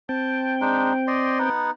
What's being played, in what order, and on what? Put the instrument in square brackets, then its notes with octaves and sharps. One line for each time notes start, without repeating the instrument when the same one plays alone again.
[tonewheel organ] C4 G5 [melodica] A5
[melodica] G#3 D4 D#4
D5 D#5 C6
B3 D#4 F#5